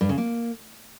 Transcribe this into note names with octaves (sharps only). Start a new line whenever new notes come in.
G2
C#3
A#3